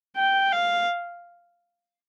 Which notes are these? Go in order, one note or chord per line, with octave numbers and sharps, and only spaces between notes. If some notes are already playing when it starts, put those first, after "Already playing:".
G5
F5